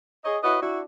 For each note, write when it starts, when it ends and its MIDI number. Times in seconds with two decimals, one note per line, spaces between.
0.25 0.37 68
0.25 0.37 73
0.25 0.37 75
0.44 0.59 64
0.44 0.59 66
0.44 0.59 71
0.44 0.59 73
0.44 0.59 75
0.61 0.81 62
0.61 0.81 64
0.61 0.81 66